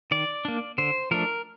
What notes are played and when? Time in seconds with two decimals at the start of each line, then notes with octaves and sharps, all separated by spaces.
0.11 D#3 D5
0.45 A#3 D4
0.78 D3 C5
1.11 F3 A3 D4 A#4